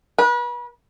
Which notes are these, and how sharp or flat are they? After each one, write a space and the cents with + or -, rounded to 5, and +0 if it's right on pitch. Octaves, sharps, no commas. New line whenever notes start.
B4 -35